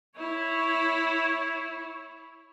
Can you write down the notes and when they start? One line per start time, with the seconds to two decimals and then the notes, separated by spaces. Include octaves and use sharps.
0.17 E4 C#5